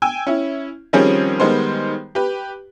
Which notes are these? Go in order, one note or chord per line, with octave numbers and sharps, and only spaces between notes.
G5 G#5 E6
C#4 E4
D#3 F3 G3 C4 C#4 G#4
D#3 G3 G#3 B3 C5
G4 B4